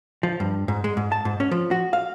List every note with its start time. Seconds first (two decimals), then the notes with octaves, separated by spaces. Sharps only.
0.23 F3
0.40 G2
0.68 G#2
0.84 G#3
0.97 G#2
1.12 A5
1.25 G#2
1.40 C#4
1.51 F3
1.71 F#4
1.93 F5